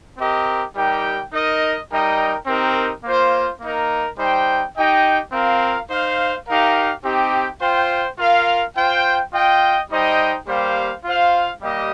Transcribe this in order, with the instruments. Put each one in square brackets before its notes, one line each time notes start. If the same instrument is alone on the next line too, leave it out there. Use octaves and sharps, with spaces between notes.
[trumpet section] C4 G4 A#4 D#5
G3 D#4 G4 A#4 G5
D#4 A#4 D#5
G3 D#4 A#4 D#5 G5
C4 D#4 G4 A#4
A#3 F4 C5
A#3 D#4 A#4
G3 D#4 C5 G5
D#4 G4 D#5 G5
C4 F4 A#4 F5
D#4 C5 F5
D#4 G4 A#4 F5
C4 D#4 G4
F4 C5 G5
F4 A#4 F5
F4 C5 G5
F4 D#5 G5
G3 D#4 C5 D#5 G5
G3 A#3 G4 C5 F5
F4 C5 F5
G3 A#3 G4 D#5